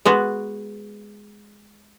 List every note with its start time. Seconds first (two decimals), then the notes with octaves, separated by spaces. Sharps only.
0.05 G#3 B3 F#4